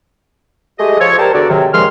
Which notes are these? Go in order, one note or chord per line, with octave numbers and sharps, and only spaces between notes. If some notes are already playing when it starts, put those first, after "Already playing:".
G#3 A3 G4 D#5
F3 A4 C#5
G4 A#4 C5 D5 A5
E2 D3 F#4 D5
G#2 C3 D#3 F#3
D#2 C#3 F3 G#3 C6 F6